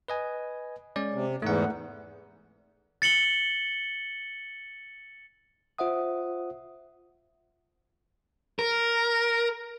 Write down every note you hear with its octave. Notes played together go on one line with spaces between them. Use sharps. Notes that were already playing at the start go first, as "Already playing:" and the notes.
B4 D#5 G#5
G#3 C#4 D5
C3
E2 G#2 A3 D#4 F#5
A6 C#7 F#7 G7
F4 C5 E5 F#5 D#6
A#4